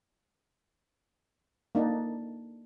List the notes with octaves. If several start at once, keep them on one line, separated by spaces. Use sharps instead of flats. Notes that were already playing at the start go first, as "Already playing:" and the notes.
A#3 D4 D#4